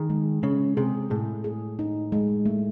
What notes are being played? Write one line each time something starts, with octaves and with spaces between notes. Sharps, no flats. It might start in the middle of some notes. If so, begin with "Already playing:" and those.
Already playing: D#3 G#4
G#3
C#3 G#3
C3 G#4
A2 G#4
G#4
D#4
G#3
A3